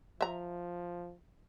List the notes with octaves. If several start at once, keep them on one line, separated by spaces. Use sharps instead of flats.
F3 E5 A#5